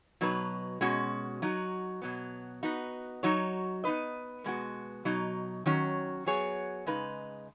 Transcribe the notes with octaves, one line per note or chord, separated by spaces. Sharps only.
B2 F#3 D#4 B4
B2 G#3 C#4 F#4
F#3 D#4 F#4
B2 F#3 B3
B3 D#4 F#4
F#3 D#4 F#4 C#5
B3 D#4 B4 D#5
B2 G#3 B3 F#4
B2 F#3 D#4
D#3 F#3 C#4
F#3 B3 G#4 C#5
C#3 G#3 D#4 B4